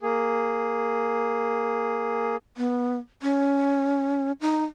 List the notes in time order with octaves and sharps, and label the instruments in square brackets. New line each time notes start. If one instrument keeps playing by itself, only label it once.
[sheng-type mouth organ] A#3 G#4
[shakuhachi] B3
C#4
D#4